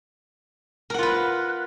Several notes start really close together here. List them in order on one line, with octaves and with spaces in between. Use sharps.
A#4 F#5 F4 B4